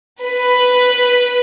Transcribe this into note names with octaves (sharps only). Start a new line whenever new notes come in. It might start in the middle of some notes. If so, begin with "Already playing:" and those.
B4